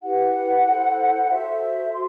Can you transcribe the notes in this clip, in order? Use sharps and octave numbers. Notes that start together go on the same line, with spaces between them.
E4 G4 B4 F#5
E4 A4 C5
F#4 A4 C5 E5
F#4 C6